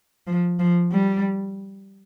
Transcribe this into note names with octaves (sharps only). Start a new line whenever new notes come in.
F3
F3
G3